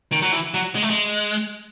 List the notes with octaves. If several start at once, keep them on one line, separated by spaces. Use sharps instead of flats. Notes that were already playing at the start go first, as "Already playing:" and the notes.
D#3
F#3
E3
F#3
G#3
A3
G#3